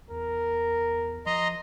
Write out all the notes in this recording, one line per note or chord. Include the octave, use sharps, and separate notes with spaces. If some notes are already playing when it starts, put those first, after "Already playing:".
E2 A#4
F3 D#5 A#5 C6